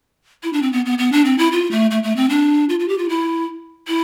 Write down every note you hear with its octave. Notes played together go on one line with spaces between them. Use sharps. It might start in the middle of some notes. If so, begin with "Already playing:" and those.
E4
D4
C4
B3
B3
B3
D4
C4
E4
F4
A3
A3
A3
C4
D4
F4
F4
G4
F4
E4
E4